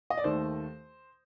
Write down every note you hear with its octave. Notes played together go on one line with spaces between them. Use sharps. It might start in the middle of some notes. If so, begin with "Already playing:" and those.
D#5
D5
D#2 D#3 A3 C5